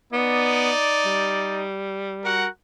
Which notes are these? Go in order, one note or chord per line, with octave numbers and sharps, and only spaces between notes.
B3 D#4 D5
G3
F#4 A#4 F#5